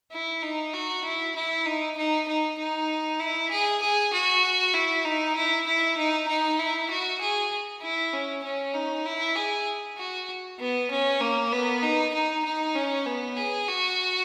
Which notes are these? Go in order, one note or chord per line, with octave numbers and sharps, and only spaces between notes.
E4
D#4
F#4
E4
E4
D#4
D#4
D#4
D#4
E4
G#4
G#4
F#4
E4
D#4
E4
E4
D#4
D#4
E4
F#4
G#4
E4
C#4
C#4
D#4
E4
G#4
F#4
B3
C#4
A#3
B3
D#4
D#4
D#4
C#4
B3
G#4
F#4